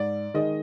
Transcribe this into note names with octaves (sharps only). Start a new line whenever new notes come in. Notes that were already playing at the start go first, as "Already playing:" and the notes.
Already playing: G#2 D5
D#3 G#3 D#5